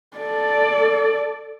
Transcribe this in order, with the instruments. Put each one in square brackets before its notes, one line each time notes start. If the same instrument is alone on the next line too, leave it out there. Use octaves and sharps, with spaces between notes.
[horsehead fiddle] A4 D5